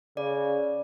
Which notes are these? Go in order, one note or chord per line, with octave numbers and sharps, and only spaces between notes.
C#3 D5